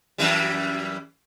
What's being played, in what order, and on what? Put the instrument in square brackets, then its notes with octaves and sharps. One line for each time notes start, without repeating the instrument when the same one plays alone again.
[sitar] F#2 E3 G3